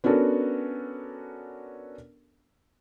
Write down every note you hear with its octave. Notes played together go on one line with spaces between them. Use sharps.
B3 C#4 D4 F#4 A4 A#4